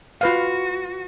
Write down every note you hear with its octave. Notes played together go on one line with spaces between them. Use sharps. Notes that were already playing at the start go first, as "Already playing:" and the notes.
F4 F#4 B4 F5